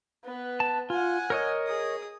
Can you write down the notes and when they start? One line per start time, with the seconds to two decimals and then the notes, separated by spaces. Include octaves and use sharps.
0.24 B3 B4
0.60 A5
0.90 F4 F#5 G#5
1.30 A#4 C#5 D#5
1.67 G#4 D#6